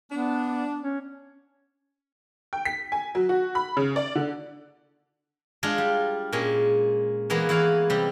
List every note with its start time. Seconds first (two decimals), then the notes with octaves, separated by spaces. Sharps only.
0.11 B3 D4
0.81 C#4
2.53 G5
2.65 B6
2.92 G#5
3.15 F#3
3.29 F#4
3.55 B5
3.77 C#3
3.96 D5
4.15 D3
5.63 G#3 D4 F4 G#4
5.78 G3
6.32 A#2 G#3 C#4
7.30 E3 G#3 A#3 B3
7.49 E3 E4 C#5 F5
7.90 C3 G3